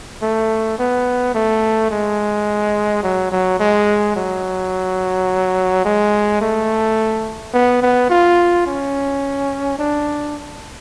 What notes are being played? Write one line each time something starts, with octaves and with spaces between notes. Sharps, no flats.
A3
B3
A3
G#3
F#3
F#3
G#3
F#3
G#3
A3
B3
B3
F4
C#4
D4